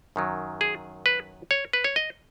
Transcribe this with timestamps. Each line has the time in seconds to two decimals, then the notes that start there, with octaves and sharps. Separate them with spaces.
0.16 F#2 D#3 F#3
0.61 G#4
1.06 B4
1.51 C#5
1.73 B4
1.84 C#5
1.96 D#5